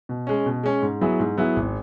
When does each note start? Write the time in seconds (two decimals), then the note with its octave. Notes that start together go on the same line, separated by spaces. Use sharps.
0.09 B2
0.27 G#3 C#4
0.46 B2
0.63 G#3 C#4
0.82 G#2
1.01 F#3 B3 E4 G#4
1.19 G#2
1.38 F#3 B3 E4 G#4
1.56 G#1